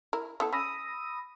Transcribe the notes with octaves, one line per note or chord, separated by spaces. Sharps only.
E4 A#4
B3 E4 A4
C#4 B5 D#6 E6 A#6